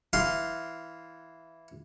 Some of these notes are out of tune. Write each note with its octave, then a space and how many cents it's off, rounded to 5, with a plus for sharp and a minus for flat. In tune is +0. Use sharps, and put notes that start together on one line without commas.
E3 +0 F5 +0 C6 +0